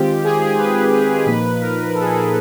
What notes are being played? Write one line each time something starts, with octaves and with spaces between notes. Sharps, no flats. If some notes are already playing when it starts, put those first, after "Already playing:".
Already playing: D#3 G#3 C4 F4 G4
G#4
B4
B4
A#2 F3 A#3 D#4 B4
A#4
A4
G#4
A4